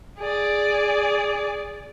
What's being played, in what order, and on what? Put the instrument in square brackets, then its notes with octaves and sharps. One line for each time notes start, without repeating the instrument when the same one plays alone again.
[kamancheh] G#4 D5